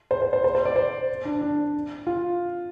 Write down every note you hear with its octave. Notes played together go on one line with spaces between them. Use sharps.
C5
C5
C5
C5
C5
D5
C5
D4
D4
F4